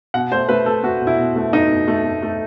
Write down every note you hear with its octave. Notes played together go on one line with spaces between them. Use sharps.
B2 F#5
A3 C5
A3 B4
A3 A4
A3 F#4
B2
E4
B2
A3
A3 D#4
B2
A3
A3
A3